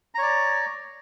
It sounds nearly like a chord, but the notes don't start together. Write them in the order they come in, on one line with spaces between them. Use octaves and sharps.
A#5 C#5 D5